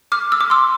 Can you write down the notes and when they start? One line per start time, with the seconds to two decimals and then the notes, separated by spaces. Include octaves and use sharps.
0.12 D6 F6
0.32 E6
0.41 D6
0.50 C6 E6